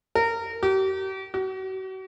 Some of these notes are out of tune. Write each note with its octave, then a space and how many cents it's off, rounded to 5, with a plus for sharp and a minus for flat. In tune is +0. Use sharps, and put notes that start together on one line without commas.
A#4 -25
G4 -40
F#4 +40